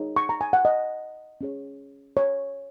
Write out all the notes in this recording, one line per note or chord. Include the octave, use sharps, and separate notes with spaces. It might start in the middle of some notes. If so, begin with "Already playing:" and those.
Already playing: D#4 G#4 C#5
C#6
A#5
G#5
F#5
D#5
C#4 G#4 C#5
C#5